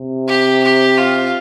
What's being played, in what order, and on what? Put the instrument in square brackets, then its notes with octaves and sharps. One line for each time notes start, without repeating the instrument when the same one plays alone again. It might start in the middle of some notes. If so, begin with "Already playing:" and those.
Already playing: [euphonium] C3
[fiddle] G4
G4
F4